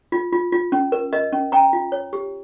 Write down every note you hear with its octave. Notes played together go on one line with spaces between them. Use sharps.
F4
F4
F4
C#4
A#4
A#4 D#5
C#4
C#4 G5 A#5
F4
C#5
G4